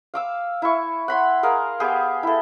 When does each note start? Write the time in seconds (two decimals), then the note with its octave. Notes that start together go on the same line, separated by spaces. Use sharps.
0.14 F5 D6 E6
0.62 E4 C#6
1.08 F#5 B5 C6
1.43 G#4 A#4 F5
1.80 B3 G4 G#4
2.23 E4 A4